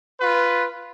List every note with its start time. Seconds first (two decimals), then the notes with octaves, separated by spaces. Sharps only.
0.20 F4 B4